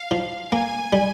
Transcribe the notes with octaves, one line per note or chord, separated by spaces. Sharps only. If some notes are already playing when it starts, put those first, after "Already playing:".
Already playing: F5
F3
A#3 G#5
G3